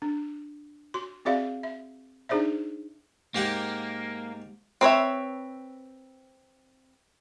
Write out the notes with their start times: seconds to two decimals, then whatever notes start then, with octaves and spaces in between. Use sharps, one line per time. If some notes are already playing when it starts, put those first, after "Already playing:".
0.02 D4
0.94 F#4 C6
1.25 C4 F#4 G#4 D5 E5 F5
1.63 E5
2.29 D4 D#4 G#4 C5 D5 E5
3.35 G#2 A#3 G4 F#5
4.81 C4 B4 C#5 E5